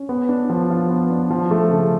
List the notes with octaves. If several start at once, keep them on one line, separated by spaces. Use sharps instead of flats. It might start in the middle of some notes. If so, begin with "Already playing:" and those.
Already playing: C#4
B3
D4
F3
F4
B3
D4
F3
A3
C#3